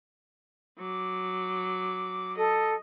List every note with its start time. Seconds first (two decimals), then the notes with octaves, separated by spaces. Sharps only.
0.79 F#3 D6
2.38 A4 D#5